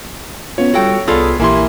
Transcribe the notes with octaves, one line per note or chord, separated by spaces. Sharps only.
B3 C#4 F4 C#5
G3 F4 F#4 A4 G5
C2 B3 F4 G#4 A4 D5 D#6
A#1 E3 A#3 E4 G4 G#5 C6